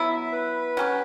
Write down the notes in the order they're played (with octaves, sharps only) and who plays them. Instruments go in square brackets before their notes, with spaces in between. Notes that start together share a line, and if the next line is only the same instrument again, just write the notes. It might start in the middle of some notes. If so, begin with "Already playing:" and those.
Already playing: [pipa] F#3 B3 E4
[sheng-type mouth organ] E5
B4
[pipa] F#3 C#4 G4